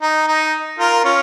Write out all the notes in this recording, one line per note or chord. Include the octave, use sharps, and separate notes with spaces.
D#4
D#4
F4 A#4
C#4 F4